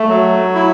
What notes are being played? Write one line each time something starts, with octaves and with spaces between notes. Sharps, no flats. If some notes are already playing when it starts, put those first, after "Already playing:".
Already playing: A3
F#3
E4